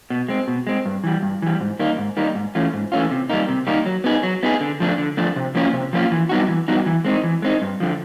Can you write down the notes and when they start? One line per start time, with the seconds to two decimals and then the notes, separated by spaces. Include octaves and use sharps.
0.10 B2
0.29 G#3 C4
0.48 B2
0.67 G#3 C4
0.86 G2
1.04 E3 G3
1.23 G2
1.42 E3 G3
1.61 G#2
1.79 D#3 G3 A#3 D#4
1.98 G#2
2.17 D#3 G3 A#3 D#4
2.35 G#2
2.55 E3 A3 C#4 F4
2.74 G#2
2.92 E3 A3 C#4 F4
3.11 C3
3.30 D#3 G3 A#3 D#4
3.48 C3
3.67 D#3 G3 A#3 D#4
3.86 F#3
4.04 B3 D#4 G#4
4.23 F#3
4.43 B3 D#4 G#4
4.61 D3
4.80 F3 A3 D4
4.98 D3
5.17 F3 A3 D4
5.36 C3
5.55 F3 A#3 C#4 F4
5.73 C3
5.93 F3 A#3 C#4 F4
6.12 E3
6.29 G3 B3 D#4 F#4
6.48 E3
6.68 G3 B3 D#4 F#4
6.86 E3
7.05 G#3 C4 D#4
7.24 E3
7.42 G#3 C4 D#4
7.62 G2
7.80 D3 F3